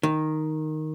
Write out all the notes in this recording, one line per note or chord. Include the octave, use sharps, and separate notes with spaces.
D#3